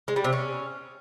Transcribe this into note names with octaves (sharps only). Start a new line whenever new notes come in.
G#3
G3
C3
C#4